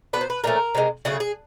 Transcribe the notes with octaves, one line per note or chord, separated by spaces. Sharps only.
F#3 B3 D4 B4
C5
B4
A#2 F3 A3 C#4 A#4
C3 E3 G#3
C#3 F#3 A3 G#4
G#4